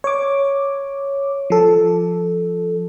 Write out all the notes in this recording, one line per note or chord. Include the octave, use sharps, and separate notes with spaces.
C#5 D6
F3 A4